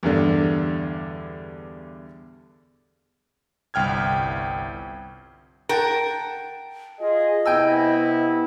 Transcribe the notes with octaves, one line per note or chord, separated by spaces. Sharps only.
E2 G2 D3
G1 C2 G5 F6 G#6
A#4 F#5 G5 A5
F4 G#4 D#5
C3 B3 E4 G5 G#5 E6